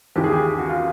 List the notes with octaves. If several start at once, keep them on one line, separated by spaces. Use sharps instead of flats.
D#2 C#3 E3 G4
G#4
G4
F#4
F4